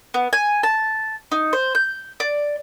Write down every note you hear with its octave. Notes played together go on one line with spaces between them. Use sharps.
B3
G#5
A5
D#4
C5
G6
D5